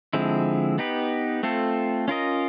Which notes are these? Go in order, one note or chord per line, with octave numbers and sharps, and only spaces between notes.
D3 F3 G#3 C4 E4
B3 D#4 G4 B4
A3 C4 F4 A4
C#4 F4 A#4 D#5